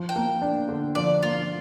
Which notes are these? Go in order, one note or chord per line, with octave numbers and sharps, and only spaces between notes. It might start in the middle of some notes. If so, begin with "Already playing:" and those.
Already playing: F3
G5
A#3
D4
D3
F3 D5
A#3 F4